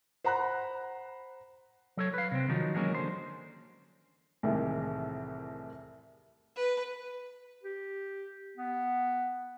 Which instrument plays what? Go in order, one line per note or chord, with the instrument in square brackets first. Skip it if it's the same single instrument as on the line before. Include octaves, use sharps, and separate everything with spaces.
[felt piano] C5 F#5 A#5 B5 F#6
[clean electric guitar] F#3 A4 C#5
B4 F5
C3 C4
D#3 F3 F#3 D#4
E3 F#3 G#3 A#3 C#4
D3 C5
[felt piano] C2 A2 C3 D#3 E3 G#3
[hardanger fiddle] B4
[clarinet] G4
B3